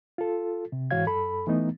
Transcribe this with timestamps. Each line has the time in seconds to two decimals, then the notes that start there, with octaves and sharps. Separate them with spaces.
0.18 F4 A4
0.72 C3
0.91 G#2 E3 F#4 C#5 F5 G#6
1.07 F#2 A4 B5
1.47 E3 A3 B3 D#4